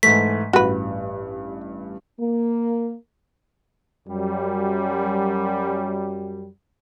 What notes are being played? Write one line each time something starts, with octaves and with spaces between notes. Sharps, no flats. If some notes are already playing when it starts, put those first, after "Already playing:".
G#2 E3 A3 B6
A1 G2 F#4 B4
A#3
F#2 G3